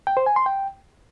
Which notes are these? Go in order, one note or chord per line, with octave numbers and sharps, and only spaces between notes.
G5
C5
G#5
C6
G5